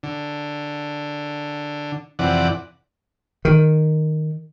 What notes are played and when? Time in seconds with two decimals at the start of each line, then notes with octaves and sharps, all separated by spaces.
0.03 D3
2.19 F2 C3 E3 D5 F#5
3.45 D#3